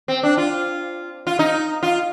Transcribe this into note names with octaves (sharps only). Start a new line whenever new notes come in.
C4
D4
F4
F4
D#4
F4